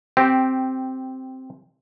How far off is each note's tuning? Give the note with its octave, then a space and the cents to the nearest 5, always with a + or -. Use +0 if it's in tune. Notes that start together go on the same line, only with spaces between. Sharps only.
C4 +0 G4 -10